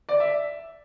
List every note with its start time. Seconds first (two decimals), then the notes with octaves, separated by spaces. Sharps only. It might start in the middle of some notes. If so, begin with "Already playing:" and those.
0.09 D5
0.20 E5